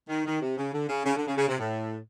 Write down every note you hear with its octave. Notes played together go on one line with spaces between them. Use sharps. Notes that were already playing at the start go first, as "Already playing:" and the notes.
D#3
D#3
C3
C#3
D3
C#3
C#3
D3
C#3
C#3
C3
A2